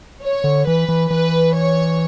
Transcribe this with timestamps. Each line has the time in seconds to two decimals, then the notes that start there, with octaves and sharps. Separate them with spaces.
0.23 C#5
0.44 D3
0.67 E3 B4
0.89 E3
1.10 E3 B4
1.55 C#5